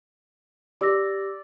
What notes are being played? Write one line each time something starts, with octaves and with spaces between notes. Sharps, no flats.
G4 D5 E6 A#6